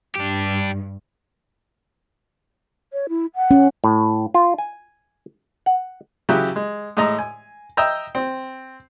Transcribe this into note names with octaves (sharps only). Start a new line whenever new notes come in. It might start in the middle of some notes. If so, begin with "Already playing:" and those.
G2 D4 G4
C#5
E4
F#5
C#4
A2
F4
G#5
F#5
C#3 F#3 E4 G4
G#3
A2 G#3 D#5 A#5
G#5
D#5 E5 G5 A#5
C4